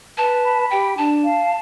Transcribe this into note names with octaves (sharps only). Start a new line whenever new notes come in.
B4 A5
B5
G4 G5
D4 A5
F5